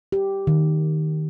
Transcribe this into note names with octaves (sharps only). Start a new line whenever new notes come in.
G4
D#3